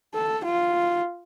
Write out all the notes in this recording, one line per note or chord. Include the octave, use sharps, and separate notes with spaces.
A4
F4